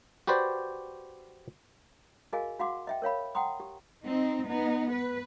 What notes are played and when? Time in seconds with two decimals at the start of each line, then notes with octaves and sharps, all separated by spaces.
0.27 F#4 G4 B4 C5 D5
2.33 F#4 G#4 A#4 D#5 F5 G#5
2.59 F#4 F5 F#5 C6 D6
2.87 D#5 E5 G5
3.02 A#4 C#5 F5 B5
3.35 F#5 G5 A#5 C6 D#6
3.60 G4
4.04 C4 D#4
4.46 B3 D#4
4.90 B4